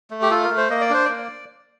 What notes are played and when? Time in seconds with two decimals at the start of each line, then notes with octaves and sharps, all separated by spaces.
0.10 A3
0.22 G4
0.31 F4 A4
0.44 A#4
0.50 A3
0.57 C5
0.70 A#3 D#5
0.81 D5
0.90 D4 C5
1.05 A#3 D5